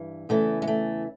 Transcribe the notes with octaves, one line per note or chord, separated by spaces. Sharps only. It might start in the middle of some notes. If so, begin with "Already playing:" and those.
Already playing: G2 E3
E2 C#3 E3 A3
G#3
A3